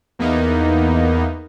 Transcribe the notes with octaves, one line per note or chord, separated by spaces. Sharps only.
E2 A#3 B3 D#4